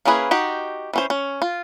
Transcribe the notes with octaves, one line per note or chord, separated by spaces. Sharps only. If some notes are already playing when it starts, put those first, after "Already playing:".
A#3 C#4 E4 G#4 B4
D#4 F#4 G4
E3 C#4 C5
C#4
F4